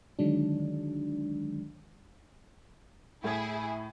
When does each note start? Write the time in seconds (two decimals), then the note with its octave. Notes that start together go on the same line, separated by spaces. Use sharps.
0.19 D3 D#3 F#3 G#3 D4
3.24 A2 E4 G#4 G#5 G#6